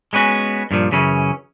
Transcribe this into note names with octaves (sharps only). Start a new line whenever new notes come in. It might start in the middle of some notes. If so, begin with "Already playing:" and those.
G#3 B3 C#4 F#4
G2 A#2 F3
F#2 C#3 E3 C#4